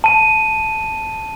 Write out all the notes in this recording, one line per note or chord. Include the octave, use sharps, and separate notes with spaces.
A5 D#7